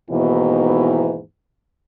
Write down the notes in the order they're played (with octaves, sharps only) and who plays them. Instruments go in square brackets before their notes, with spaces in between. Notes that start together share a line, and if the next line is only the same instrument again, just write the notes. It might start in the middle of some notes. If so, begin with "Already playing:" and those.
[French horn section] D#2 G#2 B2 E3